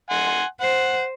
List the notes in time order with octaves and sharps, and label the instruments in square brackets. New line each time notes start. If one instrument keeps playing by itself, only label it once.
[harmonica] F#5 G#5 C6
[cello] C5 [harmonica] F#5